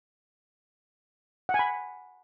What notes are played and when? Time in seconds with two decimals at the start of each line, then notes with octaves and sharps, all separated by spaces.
1.49 F#5
1.54 G#5
1.59 B5